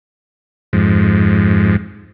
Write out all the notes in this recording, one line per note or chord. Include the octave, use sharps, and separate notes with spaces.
F2 G#2